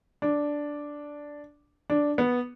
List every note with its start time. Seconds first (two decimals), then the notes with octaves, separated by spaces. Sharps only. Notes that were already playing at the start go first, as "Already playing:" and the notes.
0.22 D4
1.90 D4
2.18 B3